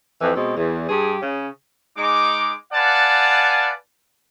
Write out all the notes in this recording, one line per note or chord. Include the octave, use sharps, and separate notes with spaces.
F2 E3
B2 G#3 C4
E2
G2 G4 G#4
C#3
G#3 D#4 D6
B4 D5 F5 F#5 G#5 A5